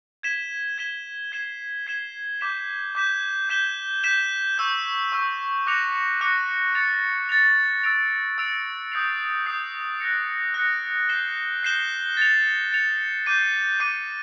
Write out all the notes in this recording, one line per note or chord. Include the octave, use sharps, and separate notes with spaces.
G#6 B6 E7 G7
G#6 B6 E7 G7
G#6 C7 E7 G7
G#6 C7 E7 G7
D6 G6 B6 E7
D6 G6 B6 E7
G6 B6 E7 G7
G6 B6 E7 G7
C#6 E6 G6
C#6 E6 G6
D6 F#6 A#6 C#7 F7
D6 F#6 A#6 C#7 F7
A6 C#7 F7
A6 C#7 F7
E6 A6 D7 F7
E6 A6 D7 F7
D#6 G6 C7 F7
D#6 G6 C7 F7
F#6 A#6 C#7
F#6 A#6 C#7
G6 C7 E7 G7
G6 C7 E7 G7
A6 C#7 F7
A6 C#7 F7
D6 G6 C7 D#7
D6 G6 C7 D#7